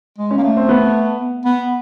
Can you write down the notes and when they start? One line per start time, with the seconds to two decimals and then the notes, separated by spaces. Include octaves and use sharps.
0.18 G#3
0.31 C#4
0.38 A#3
0.43 A3
0.57 C4
0.69 B3
1.45 B3